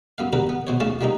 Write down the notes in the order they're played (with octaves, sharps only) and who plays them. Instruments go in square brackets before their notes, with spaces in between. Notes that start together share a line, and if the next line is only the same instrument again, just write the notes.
[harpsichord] F#2 B3 F5
C4 D4 G4 A#4 B4 F#5
B3
B2 C5 C#5
B1 E2 A3 C#4 F5 A5
F3 G3 A#3 C4 D#4